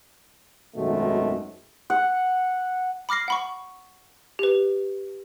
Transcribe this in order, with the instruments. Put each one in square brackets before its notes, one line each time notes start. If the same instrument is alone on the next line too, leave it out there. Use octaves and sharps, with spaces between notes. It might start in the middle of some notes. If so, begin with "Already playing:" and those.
[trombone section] G#1 F#2 B2 D#3 G#3 A3
[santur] F#5
[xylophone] B5 D6 F6 A#6 C7
F#5 B5 C#6
G4 B4